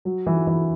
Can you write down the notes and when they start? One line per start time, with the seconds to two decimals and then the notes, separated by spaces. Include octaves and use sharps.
0.05 F#3
0.26 E3
0.47 E3